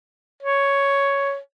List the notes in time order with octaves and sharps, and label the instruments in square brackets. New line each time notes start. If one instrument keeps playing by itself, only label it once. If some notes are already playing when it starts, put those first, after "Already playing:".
[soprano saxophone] C#5